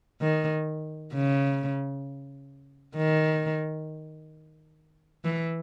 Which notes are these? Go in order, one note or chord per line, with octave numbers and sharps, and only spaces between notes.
D#3
C#3
D#3
E3